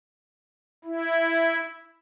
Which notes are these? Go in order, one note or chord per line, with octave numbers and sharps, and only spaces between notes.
E4